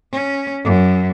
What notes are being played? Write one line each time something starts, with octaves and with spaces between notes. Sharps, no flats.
C#4
F#2